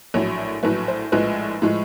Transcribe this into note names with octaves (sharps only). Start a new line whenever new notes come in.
A#1 A2 F#3 A3 C#5
A#1 A2 F#3 A3 B4
C5
A#1 A2 F3 G#3 B4
A2 F3 G#3